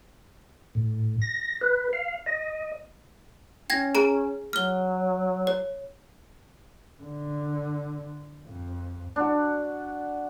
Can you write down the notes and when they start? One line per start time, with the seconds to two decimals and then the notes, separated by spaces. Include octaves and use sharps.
0.75 A2
1.22 A#6
1.61 B4
1.93 F5
2.26 D#5
3.70 C#4 G5 G#6 A#6
3.95 G#4 A#5 D7
4.53 F#3 F6 G7
5.47 C#5
7.03 D3
8.45 F2
9.16 D4 F#4